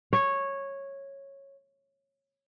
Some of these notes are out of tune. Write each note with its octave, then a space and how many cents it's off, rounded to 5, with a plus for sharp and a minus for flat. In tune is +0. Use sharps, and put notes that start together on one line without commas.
C#5 -10